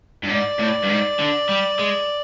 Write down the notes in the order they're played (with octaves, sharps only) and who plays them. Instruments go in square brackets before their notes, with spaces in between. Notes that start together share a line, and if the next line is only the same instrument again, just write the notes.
[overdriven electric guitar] G2
[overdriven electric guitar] G#2 [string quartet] D5
[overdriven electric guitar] A2
G2
G#2
D3
G3
G#3